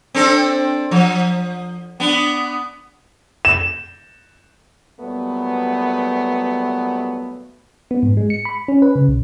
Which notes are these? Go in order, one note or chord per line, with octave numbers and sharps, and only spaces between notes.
C4 D4 A4
F3
B3 D4
E7
A#2 F#3 G3 A3 B3
B3
G#2
G#3
C#7
B5
C#4
B4
C#3
B1